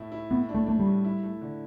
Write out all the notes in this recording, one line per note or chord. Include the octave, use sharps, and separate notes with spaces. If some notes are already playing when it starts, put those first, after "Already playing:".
Already playing: A2 A3 E4
E4
A2 B3
D4
A3
A3 D4
G3
A2
E4
A3
D3